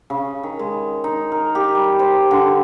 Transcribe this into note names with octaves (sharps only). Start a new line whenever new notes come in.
C#3
D#3
G#3
D#4
A#4
G4
G3
C5
D3